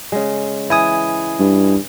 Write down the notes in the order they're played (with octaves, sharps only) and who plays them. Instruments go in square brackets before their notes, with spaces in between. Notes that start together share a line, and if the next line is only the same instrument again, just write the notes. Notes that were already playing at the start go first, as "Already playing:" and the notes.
[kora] C#3 G#3
[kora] E3 [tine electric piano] E4 G#5 D#6
[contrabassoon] G2